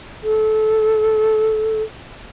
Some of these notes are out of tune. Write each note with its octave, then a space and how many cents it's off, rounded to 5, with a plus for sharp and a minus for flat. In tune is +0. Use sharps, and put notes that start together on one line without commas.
A4 -15